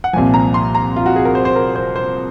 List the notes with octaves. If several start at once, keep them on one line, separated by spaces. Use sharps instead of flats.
F#5
C2 A#2 F3 G#5
A#5
C6
A#5
F4
F#4
G#4
A#4
C5
C5
A#4
C5
C5